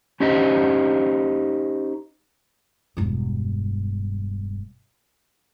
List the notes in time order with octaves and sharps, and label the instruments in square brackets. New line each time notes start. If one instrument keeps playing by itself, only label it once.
[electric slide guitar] C#4 D#4 G4 C5 D#5
[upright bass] E1 G2